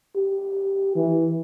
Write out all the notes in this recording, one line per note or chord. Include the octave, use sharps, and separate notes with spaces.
G4
E3